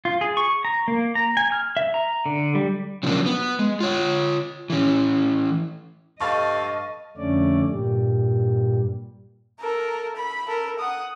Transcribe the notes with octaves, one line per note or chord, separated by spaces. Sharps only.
F4
G#4
C#6
A#5
A#3
A#5
G#5
F6
E5
A#5
D3
G3
C#3 F3 F#3 G#3 A#3 D4
B3
G#3
F4 C#5
E3 C#4
G2 A4 D#5 F5 A5 C#6 A6
F2 D3 A3 C#4 D5
G2 A#2 G3
A4 A#4
B5
A4 A#4
F#5 D#6